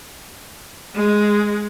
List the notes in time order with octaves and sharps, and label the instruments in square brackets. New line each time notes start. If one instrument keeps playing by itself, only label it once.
[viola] G#3